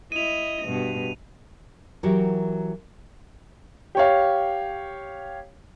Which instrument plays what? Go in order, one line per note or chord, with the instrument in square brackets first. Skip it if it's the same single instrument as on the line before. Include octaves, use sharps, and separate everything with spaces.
[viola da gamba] E4 D#5 [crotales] D#7 F7
[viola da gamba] G2 B2
[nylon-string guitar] E3 F#3 F#4 G4 A#4
[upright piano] G4 C#5 F5